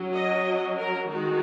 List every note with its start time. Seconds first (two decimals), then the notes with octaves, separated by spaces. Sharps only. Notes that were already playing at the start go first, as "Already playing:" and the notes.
Already playing: F#3 C#4
0.11 D#5
0.77 A#4
1.11 D#3 G#3 F#4